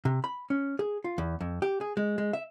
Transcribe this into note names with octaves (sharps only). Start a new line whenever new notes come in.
C3
B5
C#4
G#4
F4
E2
F2
G4
G#4
G#3
G#3
E5